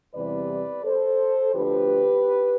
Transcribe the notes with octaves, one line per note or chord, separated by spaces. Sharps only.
E2 C3 E3 G3 B4 D5
A4 C5
D2 D3 F3 G4 B4